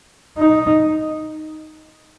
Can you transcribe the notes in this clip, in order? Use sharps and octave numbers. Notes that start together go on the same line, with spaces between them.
D#4